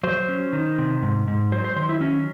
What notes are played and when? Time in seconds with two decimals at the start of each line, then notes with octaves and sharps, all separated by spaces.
0.03 F#3 C5
0.29 C#4
0.53 D#3
0.78 C3
1.02 G#2
1.28 G#2
1.52 F#3 C5
1.64 C5
1.76 D#3 C5
1.89 E4
2.01 F#3 C#4